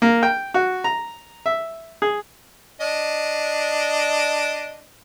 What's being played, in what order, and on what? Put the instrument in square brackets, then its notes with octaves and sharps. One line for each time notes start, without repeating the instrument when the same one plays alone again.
[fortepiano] A#3
G5
F#4
A#5
E5
G#4
[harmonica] D4 D#5